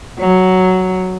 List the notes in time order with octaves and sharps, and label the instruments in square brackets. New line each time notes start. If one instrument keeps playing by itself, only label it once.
[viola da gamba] F#3